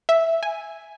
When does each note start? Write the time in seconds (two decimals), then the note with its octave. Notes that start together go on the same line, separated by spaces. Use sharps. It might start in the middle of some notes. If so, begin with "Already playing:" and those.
0.09 E5
0.43 G#5